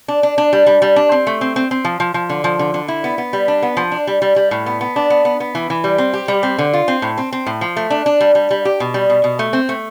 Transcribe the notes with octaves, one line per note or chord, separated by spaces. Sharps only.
D4
D4
D4
G3
G3
G3
D4
C4
A3
C4
C4
C4
F3
F3
F3
D3
F3
D3
D3
E4
B3
B3
G3
D4
B3
F3
D4
G3
G3
G3
A2
B3
B3
D4
B3
B3
B3
E3
E3
G3
C4
G4
G3
C4
D3
F4
C4
A2
C4
C4
A2
F3
A3
D4
D4
G3
G3
G3
G4
B2
G3
B2
B2
A3
C4
A3